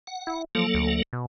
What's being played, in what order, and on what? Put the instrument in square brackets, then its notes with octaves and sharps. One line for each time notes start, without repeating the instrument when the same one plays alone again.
[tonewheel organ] F#5
[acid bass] E4
[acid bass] F3 [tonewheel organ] F#3 A#3 A4
[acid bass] D2
B2